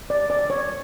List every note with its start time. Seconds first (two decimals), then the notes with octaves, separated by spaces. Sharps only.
0.10 D5
0.30 D5
0.50 C#5